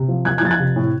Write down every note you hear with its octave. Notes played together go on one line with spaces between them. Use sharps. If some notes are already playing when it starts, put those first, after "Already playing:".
Already playing: C3
F3
F2 F#6 G#6
F#6 G#6
F2 A6
F#6 G#6
C3
A2